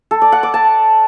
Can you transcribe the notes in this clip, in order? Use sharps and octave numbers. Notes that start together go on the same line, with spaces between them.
A4
D5
F#5
D6
A5